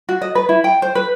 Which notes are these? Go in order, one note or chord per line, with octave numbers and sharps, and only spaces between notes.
F#4
D#5
B4
E4
G5
C5
B4